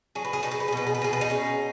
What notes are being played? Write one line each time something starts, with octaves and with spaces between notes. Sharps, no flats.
F#3 G#4
B4
G#4
D#4 B4
G#4
B4
G#4
B2 B4
G#4
B4
B2 G#4
B4
D#4 G#4
C#4